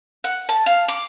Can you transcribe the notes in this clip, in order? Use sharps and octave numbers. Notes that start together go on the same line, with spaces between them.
F#5
A5
F5
D6